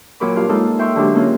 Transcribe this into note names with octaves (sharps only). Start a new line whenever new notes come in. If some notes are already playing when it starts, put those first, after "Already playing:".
A#2 F#3 A#4 B5 D6
G2 F4 F5
G#3 A#3 D#4 F4 A4
E5 G5 C6 C#6 E6 F6
D3 F#3 G#3 D4 F#4 G4
A#3 C#4 F4 A#4